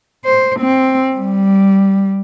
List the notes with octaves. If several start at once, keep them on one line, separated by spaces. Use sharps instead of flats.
C5
C4
G3